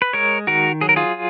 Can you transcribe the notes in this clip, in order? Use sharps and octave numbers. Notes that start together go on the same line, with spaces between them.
B4
G#3 A#4 C#5
D#3 F#4 A#4
F#3 G#4
A#4
F4 G#4